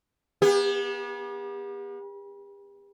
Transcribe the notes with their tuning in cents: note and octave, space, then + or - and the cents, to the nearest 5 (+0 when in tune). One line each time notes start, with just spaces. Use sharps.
B3 -40 G4 +40